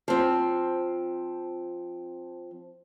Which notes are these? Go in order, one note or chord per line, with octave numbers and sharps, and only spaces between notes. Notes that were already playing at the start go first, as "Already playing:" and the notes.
F3 C4